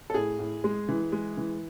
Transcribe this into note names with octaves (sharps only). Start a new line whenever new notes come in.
A4
A2 G#4
A2
G#3
E3
G#3
E3